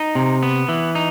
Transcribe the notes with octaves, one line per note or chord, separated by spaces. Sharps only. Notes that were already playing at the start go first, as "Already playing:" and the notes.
Already playing: D#4
C3
B3
E3
D#4